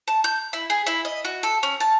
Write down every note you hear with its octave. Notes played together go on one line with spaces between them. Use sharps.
A5
G6
E4
G#4
E4
D#5
F#4
A4
C#4
A5